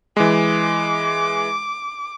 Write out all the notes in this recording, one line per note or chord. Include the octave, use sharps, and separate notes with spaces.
E3 G#3 D6